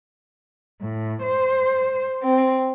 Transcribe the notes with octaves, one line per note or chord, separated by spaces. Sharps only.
A2
C5
C4